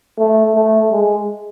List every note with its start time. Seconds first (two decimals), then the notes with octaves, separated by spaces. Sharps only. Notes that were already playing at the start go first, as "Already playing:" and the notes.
0.19 A3
0.55 A3
0.91 G#3